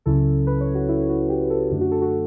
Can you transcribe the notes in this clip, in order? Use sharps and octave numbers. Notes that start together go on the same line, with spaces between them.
C#2 C#3 F#3 C#4 E4 A4
B4
C#5
F#4
E4
F#4
G4
A4
F#2 D3 A3 D4
F#4
A4
F#4